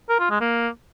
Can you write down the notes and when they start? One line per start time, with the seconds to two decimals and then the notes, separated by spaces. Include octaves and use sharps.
0.09 A#4
0.20 F4
0.30 G#3
0.41 A#3